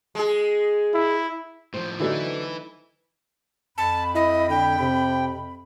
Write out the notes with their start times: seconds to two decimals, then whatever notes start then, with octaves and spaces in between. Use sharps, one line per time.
0.15 G#3 G#4
0.94 E4
1.74 A2 F3 C5
2.00 D3 E3 F#3 A3 D#4 E4 B4
3.78 F2 A5 B5
4.15 E4 D#5
4.50 D3 G5
4.80 C3